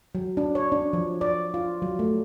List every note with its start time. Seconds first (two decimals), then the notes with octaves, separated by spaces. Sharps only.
0.15 F#3
0.37 D4
0.55 C#5
0.72 D4
0.93 F3
1.21 D5
1.54 F4
1.82 F#3
1.99 A3